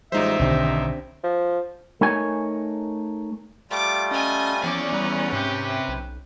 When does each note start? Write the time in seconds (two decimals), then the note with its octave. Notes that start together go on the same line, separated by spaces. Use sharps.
0.12 A1 G3 G#3 D#4 F4 C5 E5
0.40 B1 D3 D#3 C4 D4 G4
1.24 F3
2.01 A3 D#4 A#4 C#5 G#5
3.70 G3 A3 F4 D6
4.11 C#4 D#5 G#5
4.64 E2 F3 C#4 D5
4.93 G3 B4 A#5
5.33 G#2 C3 G4 B4
5.88 B1